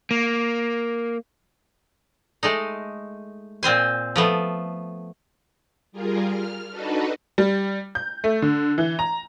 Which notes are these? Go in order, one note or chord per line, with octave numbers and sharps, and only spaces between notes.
A#3
G#3 A3 D#4
A#2 C4 C5 G#5
F3 A3 B3
G3 F4 G#4 A#4
F6
D4 D#4 F#4 A4 B4 D#5
G3
G6
A3
D3
E3
A#5